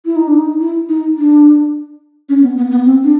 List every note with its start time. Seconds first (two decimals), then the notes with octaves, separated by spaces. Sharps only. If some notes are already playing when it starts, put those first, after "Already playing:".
0.05 E4
0.16 D#4
0.27 D4
0.39 D#4
0.60 E4
0.89 D#4
1.17 D4
2.29 C#4
2.43 B3
2.57 B3
2.71 B3
2.85 C4
3.04 D4